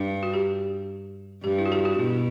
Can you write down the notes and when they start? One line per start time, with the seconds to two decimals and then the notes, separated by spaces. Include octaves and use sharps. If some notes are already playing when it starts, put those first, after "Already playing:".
Already playing: G2
0.23 F#4
0.33 G4
1.44 G2 G4
1.59 E4
1.66 F#4
1.72 G4
1.85 F#4
1.99 B2 E4